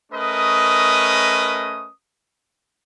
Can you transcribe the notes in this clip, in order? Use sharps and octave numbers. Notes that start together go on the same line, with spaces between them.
A3 C#4 A#4 B4 D#5 D#6